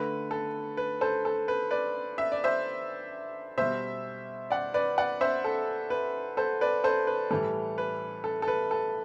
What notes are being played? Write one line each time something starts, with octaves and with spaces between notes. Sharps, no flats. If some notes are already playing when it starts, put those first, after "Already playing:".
Already playing: D3 A3 B4
A4
B4
A4 C5
A4
B4
B4 D5
E5
D5
C5 E5
B2 G3 C5 E5
D5 F#5
B4 D5
D5 F#5
C5 E5
A4
B4
A4 C5
B4 D5
A4 C5
B4
A2 E3 G3 A4
B4
A4
A4
B4
A4